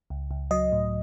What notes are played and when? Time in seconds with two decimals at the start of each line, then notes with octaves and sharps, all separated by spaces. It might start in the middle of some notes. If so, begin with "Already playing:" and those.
0.10 C#2
0.31 C#2
0.51 F#3 D#5
0.72 A2